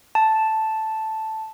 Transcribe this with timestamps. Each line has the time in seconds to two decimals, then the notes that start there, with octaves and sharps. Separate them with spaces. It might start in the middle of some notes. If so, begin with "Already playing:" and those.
0.15 A5